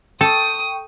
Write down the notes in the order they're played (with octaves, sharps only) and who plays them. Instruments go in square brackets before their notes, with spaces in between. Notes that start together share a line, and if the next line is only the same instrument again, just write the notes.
[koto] A4 [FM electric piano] G5 C#6 [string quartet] D#6